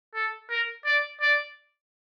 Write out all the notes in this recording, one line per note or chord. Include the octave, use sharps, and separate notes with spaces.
A4
A#4
D5
D5